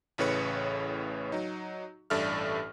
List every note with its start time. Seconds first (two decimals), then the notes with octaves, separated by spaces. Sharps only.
0.18 A1 A2 C#3 B4 C#5 C#7
1.32 F#3 D#4
2.10 A1 G2 A4 D5 E5 F6